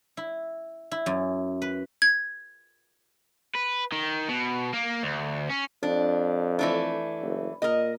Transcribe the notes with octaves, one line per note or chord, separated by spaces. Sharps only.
E4
E4
F#2
B4
G#6
B4
D#3
B2
A#3
D2
C#4
F2 D4
E3 A3 D4
F#1
A#2 A#4 D#5